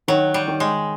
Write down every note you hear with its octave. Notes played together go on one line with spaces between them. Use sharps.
D#3 F#3
G3
D#3
G#3